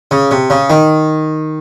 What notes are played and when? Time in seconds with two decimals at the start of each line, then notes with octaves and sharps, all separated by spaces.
0.11 C#3
0.31 C3
0.50 C#3
0.70 D#3